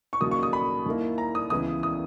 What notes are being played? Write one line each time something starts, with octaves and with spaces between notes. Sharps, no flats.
C#6
D#2 C#3 F#3 A#3 D#6
C#6
D#6
B5
D#2 D#3 A#3 E4
A#5
D#6
C#2 C#3 E3 B3 E4 D#6
D#6